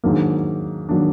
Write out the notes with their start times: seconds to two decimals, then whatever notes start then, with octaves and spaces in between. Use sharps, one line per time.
0.04 G#2 D#3 F#3 A#3 D4
0.89 D#3 F#3 A#3 D4